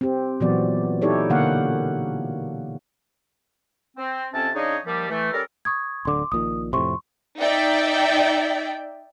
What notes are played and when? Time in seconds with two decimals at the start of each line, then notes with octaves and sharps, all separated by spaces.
0.01 C4 G4
0.40 A#2 E3 F#3 B3 F#4 D5
1.02 D#4 E4 G4 A4 C#5 D5
1.29 B2 D3 A#3 F5 F#5
3.97 C4
4.32 F2 C3 C4 C#4 A5
4.55 C#3 D4 D#4 G#4 C#5 D#5
4.85 D#2 F3 G3
5.09 E3 A3
5.32 G3 C#4 A4 A#4
5.65 C#6 D#6 G#6
6.05 D1 D3 C6 D6
6.32 A#1 A#2 D#3 D#6
6.73 F2 A2 C3 C6 C#6
7.39 D#4 D5 E5 G5